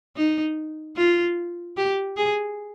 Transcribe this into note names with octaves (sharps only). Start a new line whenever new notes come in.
D#4
F4
G4
G#4